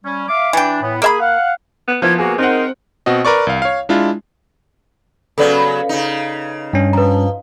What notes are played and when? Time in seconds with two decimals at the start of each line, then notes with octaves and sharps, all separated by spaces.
0.04 G3 C#4
0.28 E5 F5 D6
0.53 E3 D4 G5
0.81 A2 B3
1.02 A#3 G#4 E5 B5
1.20 F5 F#5
1.88 B3
2.02 F3 A#3 B3 E4 G#6
2.18 C3 A#3 F#4 G#4
2.38 G#2 G#3 C4 D#4 A#4 C5 F#5
3.06 B2 C4 F#4 D#5
3.25 A#4 B4 D5 C#6
3.47 C2 F5
3.62 C#5 F5
3.89 G#3 D4 E4 F4
5.38 C#3 F#3 B3 A4 D5
5.89 C#3 D#4
6.73 G2 C#4
6.93 F3 B4 A#5